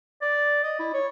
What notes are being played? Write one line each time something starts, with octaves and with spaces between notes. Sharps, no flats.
D5
D#5
E4
C#5